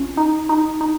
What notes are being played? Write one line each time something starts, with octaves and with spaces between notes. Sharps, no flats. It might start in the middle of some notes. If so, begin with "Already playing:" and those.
Already playing: A#1 F3 C#4
D#4
D#4
D#4